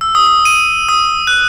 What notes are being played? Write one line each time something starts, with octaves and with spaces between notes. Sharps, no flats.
E6
D#6
D#6
D#7
D#6
F#6